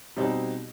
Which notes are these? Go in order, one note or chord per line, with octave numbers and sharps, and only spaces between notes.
B2 G3 C4 D#4